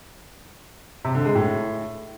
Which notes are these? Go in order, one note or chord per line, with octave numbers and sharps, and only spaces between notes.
C3
D3
G#3
A2